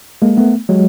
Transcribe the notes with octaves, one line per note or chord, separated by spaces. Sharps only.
G#3 A#3
A3 B3
F#3 G#3